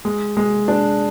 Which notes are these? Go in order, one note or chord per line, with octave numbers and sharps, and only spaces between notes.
G#3
G#3
D4